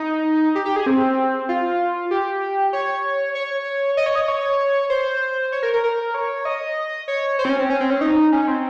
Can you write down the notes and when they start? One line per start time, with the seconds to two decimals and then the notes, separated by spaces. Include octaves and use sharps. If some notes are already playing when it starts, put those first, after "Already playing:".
Already playing: D#4
0.55 G4
0.65 G4
0.76 G#4
0.86 C4
1.49 F4
2.11 G4
2.73 C#5
3.35 C#5
3.97 D#5
4.06 C#5
4.16 D#5
4.28 C#5
4.90 C5
5.52 C#5
5.63 A#4
5.73 A#4
5.84 A#4
6.14 C#5
6.45 D#5
7.08 C#5
7.39 C5
7.45 C4
7.49 C#4
7.59 C4
7.70 C#4
7.80 C4
7.90 C#4
8.01 D#4
8.32 C#4
8.48 C4